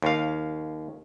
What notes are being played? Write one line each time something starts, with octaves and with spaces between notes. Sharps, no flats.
D#2 F5